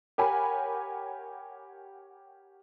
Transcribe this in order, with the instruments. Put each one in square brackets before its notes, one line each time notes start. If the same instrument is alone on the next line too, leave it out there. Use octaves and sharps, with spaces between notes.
[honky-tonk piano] G4 A#4 C#5 F#5 G#5 B5